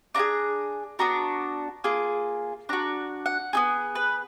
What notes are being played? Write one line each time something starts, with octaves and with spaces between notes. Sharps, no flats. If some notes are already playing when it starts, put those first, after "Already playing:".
D4 F4 G#4 A#5
B3 D4 F#4 A#5
A#3 F4 G#4
D4 F#4 A#5
F#5
B3 D#4 G#4
B4